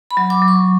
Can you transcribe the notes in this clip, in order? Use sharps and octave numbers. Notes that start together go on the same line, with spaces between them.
B5
F#3
D6
F#3
C#6